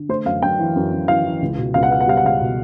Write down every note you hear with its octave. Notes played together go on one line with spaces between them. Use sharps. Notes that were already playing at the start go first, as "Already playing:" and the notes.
Already playing: D3
A3 C5
F#2 F5
F#2 G5
E3
F#2
F#2
E3 F5
E3
C#2
B2
C#2 F5
F#5
B3 F5
F#5
G3 F5
F#5
C#2 F5
B2